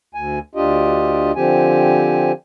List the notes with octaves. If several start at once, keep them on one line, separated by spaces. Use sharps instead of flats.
D2 G#5
D2 D4 F4 G4 D#5
D3 F3 C4 G4 G#5